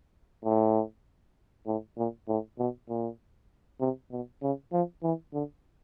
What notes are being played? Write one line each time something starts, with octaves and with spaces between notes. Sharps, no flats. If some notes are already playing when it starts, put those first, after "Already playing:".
A2
A2
A#2
A2
B2
A#2
C3
B2
C#3
F3
E3
D3